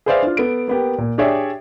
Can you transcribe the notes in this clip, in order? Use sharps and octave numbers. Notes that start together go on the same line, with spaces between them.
G#4 B4 C5 D5 E5 F5
D4 F4
B3 A4 D7
A#3 B3 G4
A#2
D4 G4 G#4 C#5 D5 E5